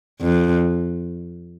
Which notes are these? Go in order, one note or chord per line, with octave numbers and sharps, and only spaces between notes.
F2